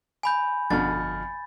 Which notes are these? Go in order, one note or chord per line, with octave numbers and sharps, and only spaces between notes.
G#5 B5 G6
G1 F2 B2 D3 F6 A6